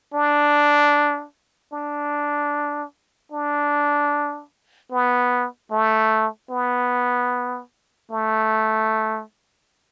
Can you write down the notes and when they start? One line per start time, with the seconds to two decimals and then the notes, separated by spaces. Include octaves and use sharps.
0.14 D4
1.73 D4
3.32 D4
4.91 B3
5.71 A3
6.50 B3
8.11 A3